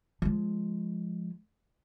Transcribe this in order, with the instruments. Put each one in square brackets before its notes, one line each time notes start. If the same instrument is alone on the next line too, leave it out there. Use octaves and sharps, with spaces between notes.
[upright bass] F3 G#3